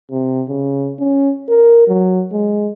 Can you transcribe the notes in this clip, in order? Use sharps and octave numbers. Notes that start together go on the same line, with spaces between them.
C3
C#3
C#4
A#4
F#3
G#3